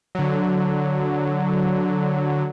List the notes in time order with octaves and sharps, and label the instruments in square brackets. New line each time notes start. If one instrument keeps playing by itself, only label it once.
[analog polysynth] D3 F#3